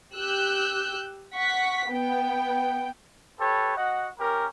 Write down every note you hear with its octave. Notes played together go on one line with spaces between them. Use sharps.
G4 E6 F#6 G6
F#5 C#6 B6
B3 G5
G4 A4 B4 C#5
F#4 D#5 F#5
C#4 G4 A#4